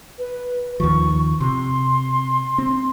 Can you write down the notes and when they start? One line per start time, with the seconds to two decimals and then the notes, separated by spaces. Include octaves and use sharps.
0.18 B4
0.80 D#2 D#3 F3 C#6
1.40 C3 C6
2.58 C4